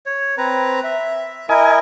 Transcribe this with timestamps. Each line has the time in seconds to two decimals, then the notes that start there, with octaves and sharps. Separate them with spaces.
0.06 C#5
0.38 C4 B4 A#5
0.84 E5
1.49 E4 A#4 D#5 G#5